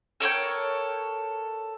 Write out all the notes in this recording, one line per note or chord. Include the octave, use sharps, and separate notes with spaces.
A4 A#4 C#5 G5